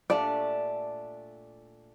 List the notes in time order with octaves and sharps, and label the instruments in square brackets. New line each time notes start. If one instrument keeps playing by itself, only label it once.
[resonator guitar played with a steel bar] A#2 A3 D4 G4 [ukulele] D5